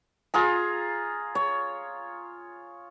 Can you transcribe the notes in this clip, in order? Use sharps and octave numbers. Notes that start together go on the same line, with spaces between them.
F4 G#4 A#5
C#5